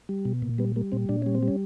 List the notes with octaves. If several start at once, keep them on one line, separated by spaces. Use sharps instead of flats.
G3
B2
A#2
G3 B3
G3 A#3
A#2 C4
A#2 D4
G3 C#4
C4
G3
C#4